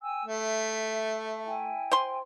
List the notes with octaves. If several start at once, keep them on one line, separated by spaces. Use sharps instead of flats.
G5 G#5 E6
A3 E5
E4 G5 G#5
C5 C6